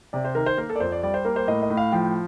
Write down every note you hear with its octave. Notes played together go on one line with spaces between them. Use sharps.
C3 D5
C5
D#3 A#4
C5
A#3 A#4
A4
D5
F2 C5
D5
G3 D5
C5
A#3 A#4
C5
A2 D#5
D#5
A2
F5
F3 G5